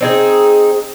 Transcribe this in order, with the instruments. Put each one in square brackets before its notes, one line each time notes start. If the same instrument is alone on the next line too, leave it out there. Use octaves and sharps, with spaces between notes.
[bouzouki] C4 D#4 G#4